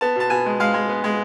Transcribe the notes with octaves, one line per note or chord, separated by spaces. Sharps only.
B3 A5
B2 A5
B2 G#5
G#3
G#3 F5
G#3
B3
G#3